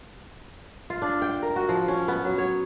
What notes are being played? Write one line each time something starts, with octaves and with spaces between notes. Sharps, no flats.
F4
D4
G5
A#4
F#4
F3
C#4
B3
F#3
C#5